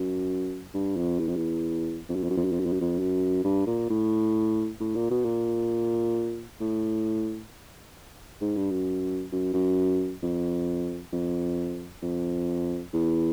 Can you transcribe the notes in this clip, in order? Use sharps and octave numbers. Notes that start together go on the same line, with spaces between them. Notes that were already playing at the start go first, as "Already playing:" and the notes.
Already playing: F#2
G2
F2
E2
F2
E2
F2
F#2
F2
F#2
F2
F#2
F2
F#2
F2
F#2
F2
F#2
G2
A#2
A2
A2
A#2
B2
A#2
A2
G#2
G2
F#2
F#2
F#2
F2
F2
F2
E2